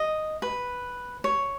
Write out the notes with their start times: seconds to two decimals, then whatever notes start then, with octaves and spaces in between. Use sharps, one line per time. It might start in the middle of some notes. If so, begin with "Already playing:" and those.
Already playing: D#5
0.42 B4
1.24 C#5